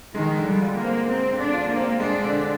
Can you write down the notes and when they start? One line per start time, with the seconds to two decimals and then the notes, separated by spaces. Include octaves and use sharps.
0.15 D#3 G#3
0.37 D3
0.46 G3
0.61 F4
0.77 A#3
0.84 C4
1.07 G#3 C4
1.31 D3
1.38 D4
1.54 F4
1.69 A#3
1.77 C4
2.00 G#3 D4
2.23 D3